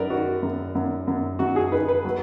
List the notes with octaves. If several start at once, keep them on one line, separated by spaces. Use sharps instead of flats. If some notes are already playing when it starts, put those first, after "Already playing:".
Already playing: F#2 A#4 B4 D5
D#3 F#4
F#2
F#2
F#2
F#2 F#4
G#4
D#3 B4
B4
F#3